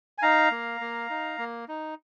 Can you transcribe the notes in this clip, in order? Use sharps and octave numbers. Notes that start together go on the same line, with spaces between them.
G#5
D#4 F5 A#5
A#3
A#3
D#4
A#3
D#4